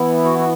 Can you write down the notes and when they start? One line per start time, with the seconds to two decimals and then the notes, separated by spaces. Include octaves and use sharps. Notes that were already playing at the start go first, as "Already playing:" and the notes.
Already playing: E3 B3 E4
0.25 F#4
0.39 F#4